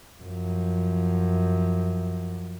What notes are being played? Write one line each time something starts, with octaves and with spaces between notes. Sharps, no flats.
F#2 F3